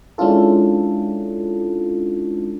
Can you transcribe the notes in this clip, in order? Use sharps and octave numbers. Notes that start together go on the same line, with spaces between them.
G#3 C#4 D4 E4 F4 A4